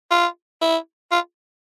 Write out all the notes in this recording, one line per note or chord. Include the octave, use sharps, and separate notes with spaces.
F4
E4
F4